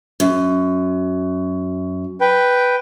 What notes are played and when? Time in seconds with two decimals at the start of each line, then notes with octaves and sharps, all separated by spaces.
0.20 F#2
2.21 B4 G5